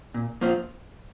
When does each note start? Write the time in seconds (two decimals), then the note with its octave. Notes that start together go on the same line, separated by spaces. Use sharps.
0.14 A#2
0.41 F3 A#3 F4 C5